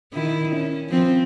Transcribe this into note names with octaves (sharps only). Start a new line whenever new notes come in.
D#3 E4
C#4
F3 C4